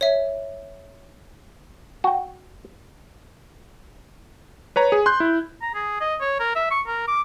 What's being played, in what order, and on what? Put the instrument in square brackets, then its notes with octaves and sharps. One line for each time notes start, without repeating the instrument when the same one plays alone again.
[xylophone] C#5 E5
[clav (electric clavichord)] F#4 G5
[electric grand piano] B4 C#5 A#5
G#4
C6 F#6 G6
E4
[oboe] A#5
G#4
D#5
C#5
A#4
E5
C#6
A#4
D6